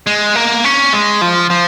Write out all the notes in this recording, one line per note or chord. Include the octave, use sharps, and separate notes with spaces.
G#3
A#3
C#4
G#3
F3
F3